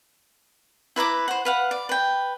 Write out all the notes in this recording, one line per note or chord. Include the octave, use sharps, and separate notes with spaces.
E4 B4 A#5 D6
C5 F#5
B4 F5 F#5
D5
B4 G5